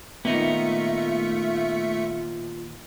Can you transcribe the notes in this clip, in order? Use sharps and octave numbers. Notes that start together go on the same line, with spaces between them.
A#2 D#3 A3 B3 D#4 F4 E5 C#7